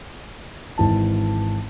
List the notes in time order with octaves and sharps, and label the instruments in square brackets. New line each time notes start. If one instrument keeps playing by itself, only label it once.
[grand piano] G#1 E3 A5